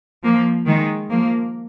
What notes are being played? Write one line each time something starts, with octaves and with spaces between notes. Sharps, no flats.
F3 A#3
D#3 G#3
F3 A#3